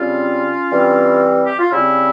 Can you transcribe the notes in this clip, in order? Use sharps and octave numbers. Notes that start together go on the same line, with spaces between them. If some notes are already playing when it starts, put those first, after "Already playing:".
Already playing: C#3 G3 C4 C#4 F4
E3 G3 C4
G4
F4
C#3 G3 C4 E4